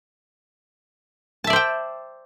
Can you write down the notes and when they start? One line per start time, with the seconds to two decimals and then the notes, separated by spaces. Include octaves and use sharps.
1.44 A5
1.47 E5
1.50 D5
1.53 C5
1.56 G5